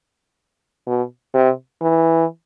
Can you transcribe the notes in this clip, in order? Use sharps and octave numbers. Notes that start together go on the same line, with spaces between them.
B2
C3
E3